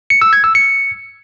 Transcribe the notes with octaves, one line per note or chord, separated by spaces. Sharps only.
C#7
E6
G#6
E6
C#7